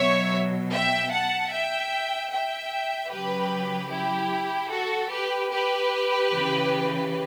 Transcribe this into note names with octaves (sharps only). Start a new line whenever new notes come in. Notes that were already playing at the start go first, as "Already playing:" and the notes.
Already playing: B2 F#3 C#5 E5
E5 G5
F#5 A5
E5 G5
E5 G5
C#3 F#3 G4 B4
E4 G4
F#4 A4
G4 B4
G4 B4
C#3 E3